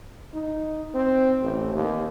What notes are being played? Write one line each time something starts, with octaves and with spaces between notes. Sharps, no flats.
D#4
C4
A1
D#2